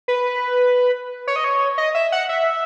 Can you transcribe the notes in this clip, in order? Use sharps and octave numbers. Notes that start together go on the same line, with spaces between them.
B4
C#5
D#5
C#5
D#5
E5
F#5
E5